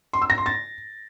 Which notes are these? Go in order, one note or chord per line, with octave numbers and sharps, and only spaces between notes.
C6
E6
A#6
C6
A6